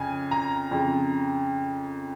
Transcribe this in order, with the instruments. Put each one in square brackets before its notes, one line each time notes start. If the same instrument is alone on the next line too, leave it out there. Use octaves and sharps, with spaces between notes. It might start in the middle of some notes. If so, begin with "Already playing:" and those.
Already playing: [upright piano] F2 C#3 G#5
A#5
F2 C#3